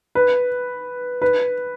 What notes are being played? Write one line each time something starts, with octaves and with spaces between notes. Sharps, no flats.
B4
B4